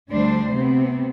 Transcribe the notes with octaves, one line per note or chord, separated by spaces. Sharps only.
D2 D3 G3 D4 C5
C3 B3 C4